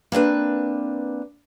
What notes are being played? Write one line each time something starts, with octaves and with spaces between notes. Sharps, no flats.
A#3 C4 D4 B4